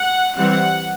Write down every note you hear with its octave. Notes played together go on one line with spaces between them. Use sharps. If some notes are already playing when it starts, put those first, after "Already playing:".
Already playing: F#5
E3 G3 C4 F#5